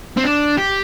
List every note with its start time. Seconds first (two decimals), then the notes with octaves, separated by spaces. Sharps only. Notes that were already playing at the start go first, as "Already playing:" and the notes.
0.17 C4
0.24 D4
0.58 G4